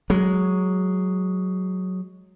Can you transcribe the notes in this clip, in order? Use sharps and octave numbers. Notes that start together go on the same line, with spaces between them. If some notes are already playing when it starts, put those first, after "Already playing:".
F#3 G#3